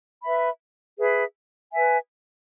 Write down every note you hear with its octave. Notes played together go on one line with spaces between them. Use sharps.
B4 E5 B5
G#4 B4 E5 B5
B4 E5 G#5